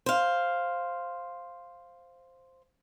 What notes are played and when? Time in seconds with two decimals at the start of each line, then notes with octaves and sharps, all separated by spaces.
0.06 C5 F5